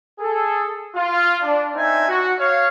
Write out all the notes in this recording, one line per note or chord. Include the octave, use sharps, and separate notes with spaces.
G#4 A4
F4
D4
C4 D4 D#4 E5 G#5
F#4
C#5 F5